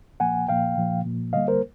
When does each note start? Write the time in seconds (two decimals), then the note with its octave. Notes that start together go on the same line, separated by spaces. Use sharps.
0.20 A#2 F3 A#3 F#5 G#5
0.48 A#2 F3 A#3 F5 G5
0.77 A#2 F3 A#3
1.05 A#2 F3 A#3
1.33 D3 G3 A#3 D#5 F5
1.48 A#4 C5